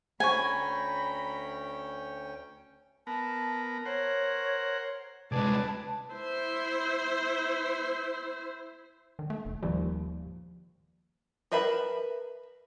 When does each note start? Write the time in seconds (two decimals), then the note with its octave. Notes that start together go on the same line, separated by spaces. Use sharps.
0.20 D2 C#4 C5 G5 G#5 A#5 B5 C#6
3.07 B3 A#4 A5
3.86 A#4 C5 C#5 F#5
5.32 C2 G#3 G#4 B4 D5 A5
6.14 E4 C5
9.19 D#3
9.30 A3
9.45 F1
9.63 D#2 F3 G3
11.52 A#4 B4 E5 A5 B5